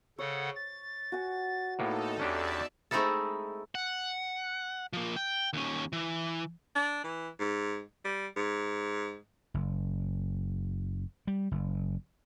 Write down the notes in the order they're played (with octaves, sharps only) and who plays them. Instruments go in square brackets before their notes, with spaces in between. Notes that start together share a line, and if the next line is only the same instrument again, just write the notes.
[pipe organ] C#3 A4 F#5 [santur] C#5
[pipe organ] A6
[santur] F#4 G#5
[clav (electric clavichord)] A2 A#3 B3 [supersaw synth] D#4 A4
[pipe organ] E2 [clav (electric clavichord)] C#4 D4 G4 [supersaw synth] D5 E5 A5
[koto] G#3 A3 C4 D#4 E4 A4
[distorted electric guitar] F#5
F3 A#3
G5
D#2 C#4
E3
[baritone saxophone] D4
E3
G#2
G3
G#2
[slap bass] F#1
G3
F#1